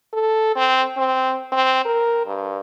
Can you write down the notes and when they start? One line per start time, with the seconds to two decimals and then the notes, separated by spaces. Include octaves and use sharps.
0.13 A4
0.56 C4
0.97 C4
1.52 C4
1.85 A#4
2.26 G2